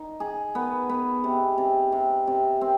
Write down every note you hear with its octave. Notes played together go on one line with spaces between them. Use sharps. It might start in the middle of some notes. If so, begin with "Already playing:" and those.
Already playing: D#4
G#4
B3
B3
C3
C3
C3
C3
C4